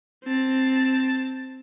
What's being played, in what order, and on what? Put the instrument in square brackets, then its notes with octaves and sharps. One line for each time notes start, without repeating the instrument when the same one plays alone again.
[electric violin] C4 A5